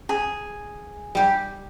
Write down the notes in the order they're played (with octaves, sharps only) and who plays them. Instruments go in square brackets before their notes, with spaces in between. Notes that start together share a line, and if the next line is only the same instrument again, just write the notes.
[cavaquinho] G#4
[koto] G3 G4